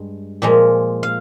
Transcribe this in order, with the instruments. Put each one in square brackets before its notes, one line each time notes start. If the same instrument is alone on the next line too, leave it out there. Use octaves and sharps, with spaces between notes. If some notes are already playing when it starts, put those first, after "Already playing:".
Already playing: [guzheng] G2 G#3
A#2 F3 G#3
F5